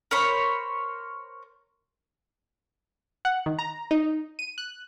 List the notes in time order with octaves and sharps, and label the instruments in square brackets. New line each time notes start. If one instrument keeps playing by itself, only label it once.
[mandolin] A#4 C5 C#5 B5
[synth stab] F#5
D#3
A#5
D#4
D#7
F#6